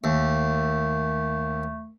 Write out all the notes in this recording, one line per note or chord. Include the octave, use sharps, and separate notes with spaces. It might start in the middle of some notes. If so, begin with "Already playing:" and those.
D#2 A3